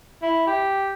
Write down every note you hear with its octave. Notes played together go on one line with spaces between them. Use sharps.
E4
G4